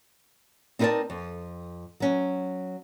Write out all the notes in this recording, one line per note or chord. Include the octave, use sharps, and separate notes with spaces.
C4 D#4 E4 A#4 D5 A5
F2
F#3 C#4